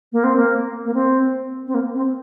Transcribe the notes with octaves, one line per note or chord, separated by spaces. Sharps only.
A#3
C4
A#3
A#3
C4
C4
A#3
C4